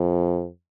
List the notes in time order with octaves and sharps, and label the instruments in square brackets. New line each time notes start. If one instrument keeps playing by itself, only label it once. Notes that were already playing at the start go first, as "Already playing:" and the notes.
Already playing: [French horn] F2